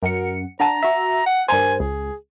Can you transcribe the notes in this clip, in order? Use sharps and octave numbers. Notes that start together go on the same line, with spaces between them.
F#2 A#4 F#5 C#7
D4 F#5 A5 A#5
F#4 E5
F#5
G2 A#4 C5 G#5
C#2 G#4